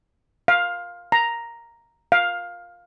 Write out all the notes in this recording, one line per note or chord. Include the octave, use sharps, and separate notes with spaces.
F5
A#5
F5